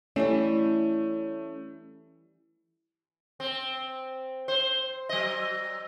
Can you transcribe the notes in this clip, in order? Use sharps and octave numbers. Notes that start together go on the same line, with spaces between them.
E3 G3 A3 C#4 E4
C4
C5
F#3 D#5